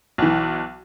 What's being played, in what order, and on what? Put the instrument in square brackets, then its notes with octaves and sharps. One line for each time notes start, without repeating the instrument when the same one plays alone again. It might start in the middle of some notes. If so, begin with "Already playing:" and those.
[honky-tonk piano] B1 E3